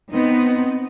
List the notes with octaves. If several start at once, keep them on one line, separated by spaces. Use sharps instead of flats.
B3 C4 D#4